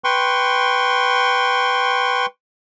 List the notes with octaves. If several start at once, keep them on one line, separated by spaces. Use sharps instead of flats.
B4 G5 C6 C#6